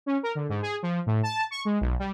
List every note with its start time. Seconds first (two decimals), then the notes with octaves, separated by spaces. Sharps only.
0.06 C#4
0.23 A#4
0.35 D3
0.49 G#2
0.62 G#4
0.83 F3
1.06 A2
1.23 A5
1.51 C#6
1.65 G#3
1.81 B1
1.99 G3